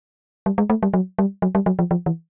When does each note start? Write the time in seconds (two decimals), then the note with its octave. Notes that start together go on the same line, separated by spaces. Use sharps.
0.46 G3
0.58 G#3
0.70 A3
0.83 G3
0.94 F#3
1.19 G3
1.42 F#3
1.55 G3
1.66 F#3
1.79 F3
1.91 F3
2.06 E3